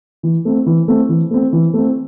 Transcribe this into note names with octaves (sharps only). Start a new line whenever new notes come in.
E3
A3 C4
E3
A3 C4
E3
A3 C4
E3
A3 C4